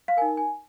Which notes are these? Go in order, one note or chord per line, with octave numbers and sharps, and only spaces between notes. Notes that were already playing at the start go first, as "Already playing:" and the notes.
F5
D#4 A#4 G#5
G#5